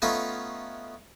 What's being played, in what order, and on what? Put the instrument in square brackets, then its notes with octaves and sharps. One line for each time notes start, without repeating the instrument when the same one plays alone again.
[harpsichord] A3 B3 C#4 D#4 F4